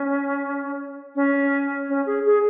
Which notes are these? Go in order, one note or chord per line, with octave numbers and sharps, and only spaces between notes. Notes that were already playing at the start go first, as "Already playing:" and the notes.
Already playing: C#4
C#4
C#4
G#4
G#4